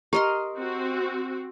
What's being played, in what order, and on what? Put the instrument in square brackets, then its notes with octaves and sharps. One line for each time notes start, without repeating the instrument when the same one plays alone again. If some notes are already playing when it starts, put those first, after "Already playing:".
[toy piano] G4 [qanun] A#4 D#5 C6
[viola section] C4 F#4